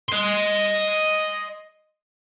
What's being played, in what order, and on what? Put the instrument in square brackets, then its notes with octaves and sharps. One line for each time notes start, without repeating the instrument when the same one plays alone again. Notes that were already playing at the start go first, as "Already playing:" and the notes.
[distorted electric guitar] D#5 C6